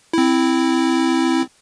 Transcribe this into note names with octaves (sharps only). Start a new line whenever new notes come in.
C4 E4